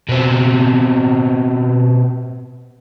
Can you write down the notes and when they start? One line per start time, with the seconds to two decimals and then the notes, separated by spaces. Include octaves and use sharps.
0.09 B2 C4